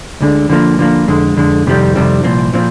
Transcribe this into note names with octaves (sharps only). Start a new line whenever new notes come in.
D2 D3 G#3
D3 F3 A#3
D3 F3 A#3
F2 D3 G#3
F2 D3 G#3
F2 C3 D#3 G3 C4
F2 C3 D#3 G3 C4
C2 A#2 F3 C4
A#2 F3 C4